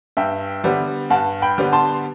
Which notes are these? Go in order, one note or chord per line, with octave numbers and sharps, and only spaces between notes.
G2 E5 G5
D3 G3 B3
G2 F#5 A5
G5 B5
D3 G3 B3
A5 C6